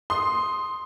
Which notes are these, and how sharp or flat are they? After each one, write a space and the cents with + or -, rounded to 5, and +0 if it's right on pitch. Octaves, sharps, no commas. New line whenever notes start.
C6 +0 D#6 +0